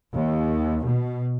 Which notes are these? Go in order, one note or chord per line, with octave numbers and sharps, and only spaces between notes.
D#2
B2